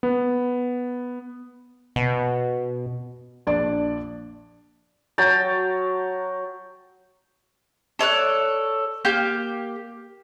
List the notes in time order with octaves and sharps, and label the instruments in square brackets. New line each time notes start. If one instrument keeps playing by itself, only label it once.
[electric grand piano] B3
[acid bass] B2
[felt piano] A#1 D4 D5
[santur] F#3 G5 A5 A#5
[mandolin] A4 C#5 D5 F#6
A#3 G4 F6 G6